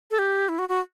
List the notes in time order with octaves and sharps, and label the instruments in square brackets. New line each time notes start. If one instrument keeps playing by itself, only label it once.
[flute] A4
G4
E4
F#4
F#4